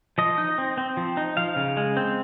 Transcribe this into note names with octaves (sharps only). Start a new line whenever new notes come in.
F3 D#5
D#4
C4
C4
F3
D#4
F3 F5
C#3
G#3
C4